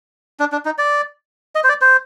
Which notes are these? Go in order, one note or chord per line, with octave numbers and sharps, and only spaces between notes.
D4
D4
D#4
D5
D#5
C5
D5
C5